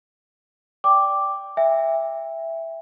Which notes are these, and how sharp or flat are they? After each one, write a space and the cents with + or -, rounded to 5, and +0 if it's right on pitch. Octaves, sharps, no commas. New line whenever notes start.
D5 -10 G5 +0 D6 +0
E5 +0 G5 +40